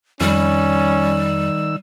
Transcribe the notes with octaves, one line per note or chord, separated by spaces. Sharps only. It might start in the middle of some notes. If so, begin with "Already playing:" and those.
F2 D#3 G3 C#4 E6